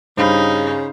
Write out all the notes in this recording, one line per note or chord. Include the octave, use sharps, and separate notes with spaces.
G2 C#3 G3 D#4 C5 F5 B5